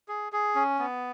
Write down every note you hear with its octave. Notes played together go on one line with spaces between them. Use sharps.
G#4
G#4
C#4
B3